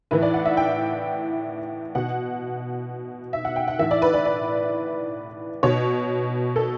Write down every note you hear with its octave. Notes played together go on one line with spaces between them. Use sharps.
A2 E3 B4
D5
F#5
E5
G5
B2 F#5
E5
F#5
G5
F#5
A2 E3 E5
D5
B4
D5
D5
B2 C#5
A4